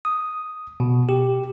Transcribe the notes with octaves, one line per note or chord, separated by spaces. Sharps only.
D#6
B2
G4